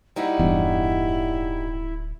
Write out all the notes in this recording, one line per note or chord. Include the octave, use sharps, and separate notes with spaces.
G3 D#4 E4 F#4
D1 E2 G2